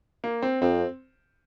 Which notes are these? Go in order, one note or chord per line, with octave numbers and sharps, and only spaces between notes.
A#3
C4
F2 C4